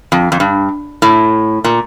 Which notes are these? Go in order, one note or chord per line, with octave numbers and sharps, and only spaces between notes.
F2
F2
G2
A2
A#2